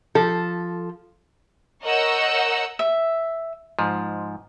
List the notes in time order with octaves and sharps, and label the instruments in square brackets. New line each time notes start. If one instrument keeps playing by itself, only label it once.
[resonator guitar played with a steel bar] F3 A4
[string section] A#4 C#5 D#5 F#5 E6 G6
[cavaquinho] E5
[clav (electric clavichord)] G#2 F3